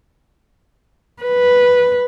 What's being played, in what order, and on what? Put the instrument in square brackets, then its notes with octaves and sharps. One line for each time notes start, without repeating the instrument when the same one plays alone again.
[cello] B4